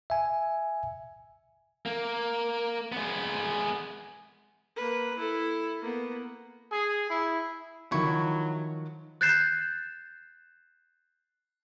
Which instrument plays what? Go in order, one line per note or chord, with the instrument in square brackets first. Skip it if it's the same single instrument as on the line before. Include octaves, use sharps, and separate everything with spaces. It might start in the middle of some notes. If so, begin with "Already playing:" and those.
[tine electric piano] E5 G#5
[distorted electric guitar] A#3
G#3 B3
[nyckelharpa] A#3 B4
E4 A4
A#3 B3
[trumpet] G#4
E4
[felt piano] D#3 F3 [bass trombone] F#3 [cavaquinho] E4 C#6
[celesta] F#6 G6 A6 C7 E7